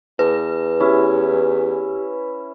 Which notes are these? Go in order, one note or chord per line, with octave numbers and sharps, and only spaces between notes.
E2 B4
C#4 E4 G4